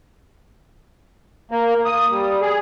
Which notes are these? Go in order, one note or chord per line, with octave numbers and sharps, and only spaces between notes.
A#3
D#6
G3
G#4